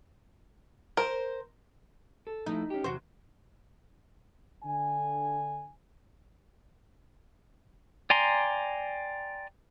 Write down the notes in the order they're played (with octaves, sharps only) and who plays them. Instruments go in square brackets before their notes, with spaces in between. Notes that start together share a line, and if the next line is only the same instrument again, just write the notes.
[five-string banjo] A#4 [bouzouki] C5
[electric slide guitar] A4
[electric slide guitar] F3 A3 E4 [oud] D#4
[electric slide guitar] C#4 G4
[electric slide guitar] E2 C3 F#3 [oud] F#4 C5
[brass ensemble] D3 G#5
[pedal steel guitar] D5 G5 G#5 A#5 C6